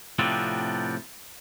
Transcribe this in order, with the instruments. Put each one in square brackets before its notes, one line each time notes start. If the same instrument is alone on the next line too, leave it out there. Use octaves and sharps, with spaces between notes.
[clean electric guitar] A2 C3 F3 B3 C4 D4